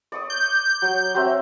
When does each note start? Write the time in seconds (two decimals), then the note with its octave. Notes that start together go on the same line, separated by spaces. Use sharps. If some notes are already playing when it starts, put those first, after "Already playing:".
0.12 D5 C#6 D#6
0.30 G6
0.82 F#3
1.15 F#3 C4 E5